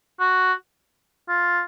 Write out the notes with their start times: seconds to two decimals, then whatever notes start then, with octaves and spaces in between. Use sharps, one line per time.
0.20 F#4
1.29 F4